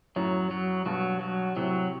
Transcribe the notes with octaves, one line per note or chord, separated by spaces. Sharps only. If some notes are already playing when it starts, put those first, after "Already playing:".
F#2 A2 F#3
F#3
G2 B2 F#3
F#3
A2 C3 F#3